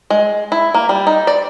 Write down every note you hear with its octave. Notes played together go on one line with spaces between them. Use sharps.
G#3
E4
A#3
G3
D#4
D5